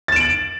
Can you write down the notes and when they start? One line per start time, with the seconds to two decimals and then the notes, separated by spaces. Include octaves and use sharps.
0.08 A6
0.12 E7
0.16 D7
0.20 F#7